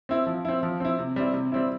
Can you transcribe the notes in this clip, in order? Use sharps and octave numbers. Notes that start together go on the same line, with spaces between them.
C4 E4
F3
C4 E4
F3
C4 E4
C3
G3 C4 E4
C3
G3 C4 E4